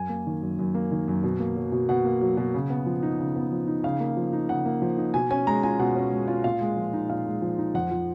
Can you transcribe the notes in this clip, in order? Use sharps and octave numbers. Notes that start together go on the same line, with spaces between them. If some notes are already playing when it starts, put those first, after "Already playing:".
Already playing: F#2 G#5
A#3
D#3
F#2
F#2
A#3
D#3
F#2
B2
A#3
F#3
B2
B2 F#5
A#3
F#3
B2
C#3
B3
F3
D#4
C#3
B3
F3
D#4
C#3 F5
A#3
F3
D#4
C#3 F#5
A#3
F3
D#4
B2 G#5
C#4 G#5
G#3 A#5
F4 G#5
B2 F#5
C#4
G#3
F4
A#2 F5
G#3
F3
D#4
A#2 F5
G#3
F3
D#4
F2 F#5
F3